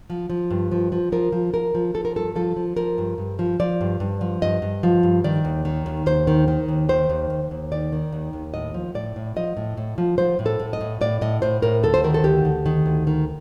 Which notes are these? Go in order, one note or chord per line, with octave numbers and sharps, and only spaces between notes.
F3
F3
G2
F3
F3
F3 A#4
F3
F3 A#4
F3
F3 A4
A#4
G2 A4
F3 A4
F3
F3 A#4
G2
G2
F3
F3 D5
G2
G2
F3
G2 D#5
G2
F3
G2
D#3 D5
D#2
D#3
D#2
D#2 C5
D#3
D#3
D#2
D#3 C5
D#2
D#2
D#2
D#3 D5
D#3
D#2
D#2
A2 D#5
F3
A2 D5
A2
F3 D#5
A2
A2
F3
F3 C5
A2
A4
A2
D#5
A2
A2 D5
A2 D#5
A2 C5
A2 A#4
D2 A4
C5
D#3 A#4
A4
D2 G4
D2
D#3
D2
D#3